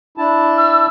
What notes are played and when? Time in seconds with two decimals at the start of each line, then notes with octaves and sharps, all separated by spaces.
0.18 D4 E4 A5
0.57 E6